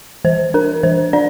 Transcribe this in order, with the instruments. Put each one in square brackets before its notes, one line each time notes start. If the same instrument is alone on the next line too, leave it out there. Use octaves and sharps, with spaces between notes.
[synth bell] E3 C5
D4 A#4
E3 C5
D4 D5